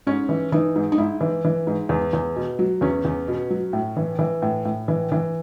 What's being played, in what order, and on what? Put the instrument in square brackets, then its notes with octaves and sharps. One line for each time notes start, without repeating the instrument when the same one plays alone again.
[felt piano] G#2 C#4
E3
E3 D#4
G#2
D#4
G#2 E4
E3
E3
G#2
E2
E2
B2
F#3
E2 C#4
E2
B2
F#3
A2
E3
E3
A2
A2
E3
E3